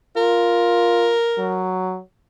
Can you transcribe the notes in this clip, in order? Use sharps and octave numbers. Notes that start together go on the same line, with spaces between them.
F4 A#4
F#3